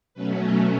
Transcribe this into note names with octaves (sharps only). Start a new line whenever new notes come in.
B2 F#3 A3 C#4 B4
A4